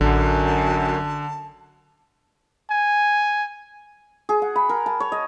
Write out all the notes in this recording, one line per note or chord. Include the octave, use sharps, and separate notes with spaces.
A1 F#2 D3 A5
G#5
G#4
F#5
B5
A#4
A5
C#5
D#5